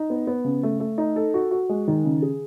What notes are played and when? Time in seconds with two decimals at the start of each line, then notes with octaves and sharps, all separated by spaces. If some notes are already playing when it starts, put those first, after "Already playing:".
Already playing: D#4
0.10 B3
0.27 B3
0.44 C#3
0.63 A3
0.80 A3
0.98 D#4
1.16 A4
1.34 F#4
1.51 F#4
1.69 G#3
1.88 D#3
2.05 C#3
2.22 G#4